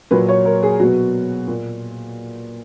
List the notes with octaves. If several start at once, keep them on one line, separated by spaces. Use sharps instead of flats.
A#2 F#3 B4
C#5
A#4
G#4
B2 F#3 F#4
A#2